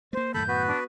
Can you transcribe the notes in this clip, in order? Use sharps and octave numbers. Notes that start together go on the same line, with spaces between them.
A3 A#3 C5
F#2 A2 D#3 A4 B5 G6
B3 F#4 B4
D4